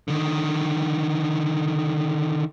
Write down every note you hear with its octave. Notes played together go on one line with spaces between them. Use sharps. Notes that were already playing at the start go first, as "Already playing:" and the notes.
D3 D#3